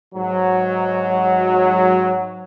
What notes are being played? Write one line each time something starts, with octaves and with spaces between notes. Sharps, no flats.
G#2 F#3